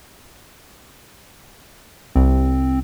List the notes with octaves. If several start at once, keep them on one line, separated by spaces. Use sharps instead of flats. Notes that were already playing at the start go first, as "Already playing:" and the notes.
C2 C4